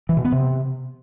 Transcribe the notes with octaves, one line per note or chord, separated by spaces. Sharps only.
E3
B2
B3
C3